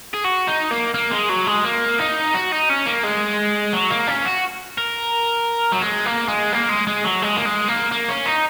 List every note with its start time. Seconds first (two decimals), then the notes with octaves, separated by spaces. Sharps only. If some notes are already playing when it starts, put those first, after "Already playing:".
0.14 G#4
0.25 F#4
0.48 D#4
0.71 A#3
0.94 A#3
1.11 G#3
1.29 F#3
1.47 G#3
1.64 A#3
1.99 D#4
2.34 F#4
2.52 D#4
2.69 C#4
2.86 A#3
3.03 G#3
3.73 F#3
3.90 A#3
4.07 C#4
4.25 F#4
4.78 A#4
5.72 F#3
5.82 G#3
6.06 A#3
6.28 G#3
6.53 A#3
6.69 G#3
6.87 G#3
7.04 F#3
7.22 G#3
7.36 A#3
7.45 G#3
7.68 A#3
7.92 A#3
8.09 C#4
8.26 D#4